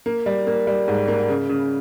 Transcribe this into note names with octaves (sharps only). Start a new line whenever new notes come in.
A#3
G3
A#3
G3
G#2
A#3
C#3
C#3